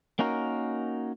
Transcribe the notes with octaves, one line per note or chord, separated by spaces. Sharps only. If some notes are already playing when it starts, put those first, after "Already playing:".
A#3 C#4 D#4 F#4 A#4